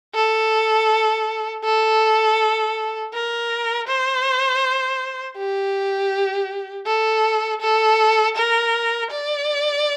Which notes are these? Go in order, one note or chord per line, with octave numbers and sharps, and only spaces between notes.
A4
A4
A#4
C5
G4
A4
A4
A#4
D5